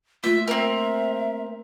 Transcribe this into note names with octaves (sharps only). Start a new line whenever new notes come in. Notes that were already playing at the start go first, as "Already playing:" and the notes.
A3 A#3 F4 E5
C4 A#4 E5